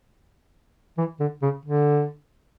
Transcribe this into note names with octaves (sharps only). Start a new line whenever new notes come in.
E3
D3
C#3
D3